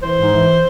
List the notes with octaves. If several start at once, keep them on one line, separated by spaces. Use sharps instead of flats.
E3 C5
G#2
E3